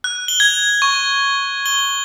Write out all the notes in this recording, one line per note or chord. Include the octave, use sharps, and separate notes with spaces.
F#6
G7
G#6
C#6
G7